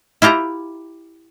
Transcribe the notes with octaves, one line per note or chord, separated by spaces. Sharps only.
E4 F4 G4 A#5